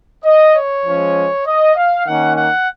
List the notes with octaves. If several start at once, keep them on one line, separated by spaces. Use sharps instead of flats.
D#5
C#5
F3 G#3 C#4
D#5
F5
D#3 A#3 C#4 F#5
F#5